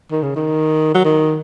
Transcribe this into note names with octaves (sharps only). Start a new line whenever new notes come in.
D#3
C#3
D#3
F#3
D#3